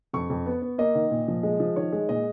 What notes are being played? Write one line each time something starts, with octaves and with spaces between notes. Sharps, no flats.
F2 C#6
F2
B3
B3
A#3 D#5
D#3
A#2
F3
G#3
F3
D#3 C#5
G#3
A#2 D#5